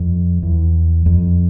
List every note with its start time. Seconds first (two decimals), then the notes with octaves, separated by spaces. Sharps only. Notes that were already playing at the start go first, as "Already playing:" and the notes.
Already playing: F2
0.43 E2
1.06 F2